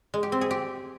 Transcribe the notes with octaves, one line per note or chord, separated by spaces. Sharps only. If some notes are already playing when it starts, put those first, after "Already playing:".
G#3
G4
C4
G#4
G4